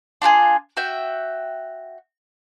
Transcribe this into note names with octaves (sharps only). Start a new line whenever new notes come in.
D4 F4 F#4 G#4
F#4 E5 G5